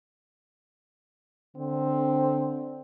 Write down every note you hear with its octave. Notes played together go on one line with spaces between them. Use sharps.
D3 C4